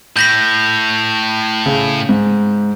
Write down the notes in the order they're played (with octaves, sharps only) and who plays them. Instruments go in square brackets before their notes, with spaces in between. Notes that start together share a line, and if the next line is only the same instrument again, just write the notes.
[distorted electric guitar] A2 [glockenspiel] G6 A#6 B6
[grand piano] C#3
G#2